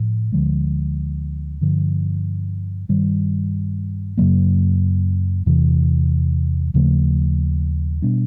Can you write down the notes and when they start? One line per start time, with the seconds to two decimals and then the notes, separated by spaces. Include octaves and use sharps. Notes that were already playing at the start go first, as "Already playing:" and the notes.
Already playing: A2 F3
0.32 D2 D3 F3 G#3
1.61 G2 D3 F3
2.89 G2 D#3 G3
4.17 F#2 C#3 F#3 A#3
5.46 E2 C3 E3
6.74 D#2 C#3 F3 A3
8.02 B2 G3 B3 D4